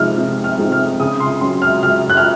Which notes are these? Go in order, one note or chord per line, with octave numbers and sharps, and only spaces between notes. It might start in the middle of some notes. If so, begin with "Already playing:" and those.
Already playing: C3 F3 G#3 C4 D#4 F6
C3
F6
F3 G#3 C4 D#4
F6
C#3 D#6
C6
F#3 C#4 C6
F6
C#3 F6
F#6
F6